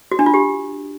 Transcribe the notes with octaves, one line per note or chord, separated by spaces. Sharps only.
F#4
D4
F4
G4